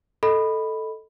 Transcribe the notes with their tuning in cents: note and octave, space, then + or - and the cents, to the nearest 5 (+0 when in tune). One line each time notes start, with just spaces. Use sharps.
A4 +0 D#5 +0 B5 +0